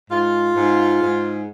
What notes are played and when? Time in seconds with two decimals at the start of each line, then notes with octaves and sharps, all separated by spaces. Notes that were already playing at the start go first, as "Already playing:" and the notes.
0.10 G#2 F4
0.56 G#2
1.02 G#2